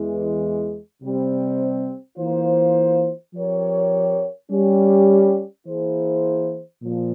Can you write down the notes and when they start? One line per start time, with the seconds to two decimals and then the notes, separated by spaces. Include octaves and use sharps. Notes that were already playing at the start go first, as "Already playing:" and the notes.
Already playing: E2 E3 G#3
1.01 C3 G3 C4
2.18 E3 A#3 F4 C5
3.34 F3 C4 G4 A#4 C#5
4.50 G3 C#4 G4
5.67 E3 A#3 E4 G#4 C5
6.82 A#2 F3